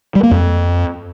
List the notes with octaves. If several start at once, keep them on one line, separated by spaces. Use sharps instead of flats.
G3
A#3
F2